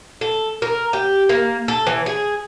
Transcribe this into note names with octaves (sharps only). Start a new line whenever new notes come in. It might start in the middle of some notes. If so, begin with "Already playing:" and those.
A4
A#4
G4
A#3
A4
E3
G#4